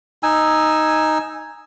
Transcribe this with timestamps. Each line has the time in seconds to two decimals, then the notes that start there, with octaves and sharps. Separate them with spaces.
0.23 D#4 G#5 E6